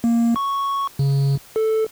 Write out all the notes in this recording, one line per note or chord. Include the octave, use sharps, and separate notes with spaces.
A#3
C#6
C#3
A4